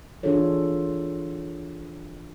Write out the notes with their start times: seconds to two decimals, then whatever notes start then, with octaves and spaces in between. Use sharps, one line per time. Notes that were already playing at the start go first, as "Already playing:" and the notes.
0.23 E3 D4 F4 G#4 A4 C#5